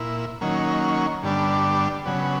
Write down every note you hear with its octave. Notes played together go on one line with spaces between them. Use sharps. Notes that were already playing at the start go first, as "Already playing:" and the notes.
Already playing: A#2 E4
D#3 F#3 A#3 C#4
G2 D3 G3 B3 D4
C#3 F#3 B3